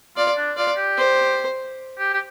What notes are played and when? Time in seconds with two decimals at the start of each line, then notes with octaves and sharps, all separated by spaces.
0.17 F4 D5
0.37 D4
0.57 F4 D5
0.77 G4
0.97 C5
1.98 G4
2.13 G4